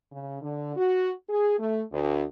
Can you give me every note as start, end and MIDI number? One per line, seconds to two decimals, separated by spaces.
0.12 0.38 49
0.42 0.74 50
0.76 1.11 66
1.29 1.58 68
1.59 1.82 57
1.92 2.24 38